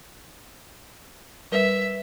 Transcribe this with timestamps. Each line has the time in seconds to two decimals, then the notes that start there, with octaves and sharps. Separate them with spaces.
1.52 G3 A#4 B4 E5